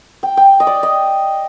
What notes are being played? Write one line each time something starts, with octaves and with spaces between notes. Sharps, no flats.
G5
G5
D#5
D5
D#5